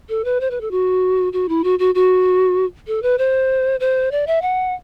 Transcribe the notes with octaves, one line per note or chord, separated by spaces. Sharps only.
A4
B4
C5
B4
A4
F#4
F#4
E4
F#4
F#4
F#4
A4
B4
C5
C5
D5
E5
F#5